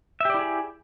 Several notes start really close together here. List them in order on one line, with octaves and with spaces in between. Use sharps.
E5 G4 D5 E4 G#4